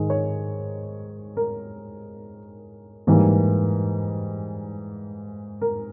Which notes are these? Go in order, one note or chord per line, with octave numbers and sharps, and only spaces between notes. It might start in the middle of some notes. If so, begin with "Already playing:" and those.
Already playing: G#2 D#3 G#3
C#5
A#4
G#2 E3 G3 A#3
A#4